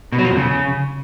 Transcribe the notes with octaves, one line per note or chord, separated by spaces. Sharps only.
B2
F#3
F3
F2
C#3